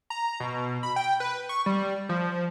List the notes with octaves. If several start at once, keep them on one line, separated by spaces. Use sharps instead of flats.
A#5
B2
B5
G5
B4
C#6
G3
F3